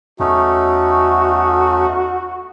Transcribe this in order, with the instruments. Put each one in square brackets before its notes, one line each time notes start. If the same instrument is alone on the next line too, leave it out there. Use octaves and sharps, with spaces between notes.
[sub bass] E2 [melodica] A3 C#4 D#4 [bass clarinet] F#4